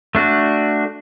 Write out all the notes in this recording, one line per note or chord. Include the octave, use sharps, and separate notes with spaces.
A3 D4 F#4